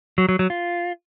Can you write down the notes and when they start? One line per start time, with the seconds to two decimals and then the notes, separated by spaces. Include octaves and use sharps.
0.18 F#3
0.29 F#3
0.39 F#3
0.50 F4